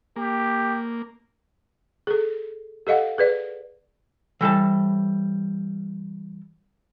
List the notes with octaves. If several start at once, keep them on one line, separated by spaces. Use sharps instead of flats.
A#3 G4
G#4 A4
G4 A4 D#5 F5 F#5
G#4 B4 D5
E3 G3 A4 A5